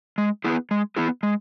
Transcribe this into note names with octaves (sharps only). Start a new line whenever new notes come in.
G#3
B3 E4 G#4
G#3
B3 E4 G#4
G#3